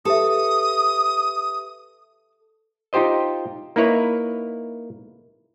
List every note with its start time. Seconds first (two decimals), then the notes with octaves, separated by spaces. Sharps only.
0.05 G4 A4 B4 E5 D#6
2.93 D#4 F4 G4 C5 D#5
3.76 A#3 D#4 E4 B4 C#5